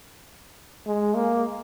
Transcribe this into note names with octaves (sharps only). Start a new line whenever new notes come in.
G#3
A#3